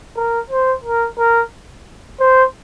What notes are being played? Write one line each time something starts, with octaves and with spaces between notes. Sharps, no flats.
A#4
C5
A#4
A#4
C5